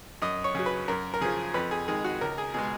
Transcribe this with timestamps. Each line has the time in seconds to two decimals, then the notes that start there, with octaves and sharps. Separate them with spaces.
0.22 F#2 D#5
0.44 C#5
0.55 C#3 F#3
0.66 B4
0.88 F#2 A#4
1.14 A#4
1.21 C#3 F3 G#4
1.54 F2 B4
1.71 G#4
1.88 D#3 G#3 G#4
2.04 F#4
2.21 C#2 A#4
2.38 G#4
2.54 B2 G#3 G#4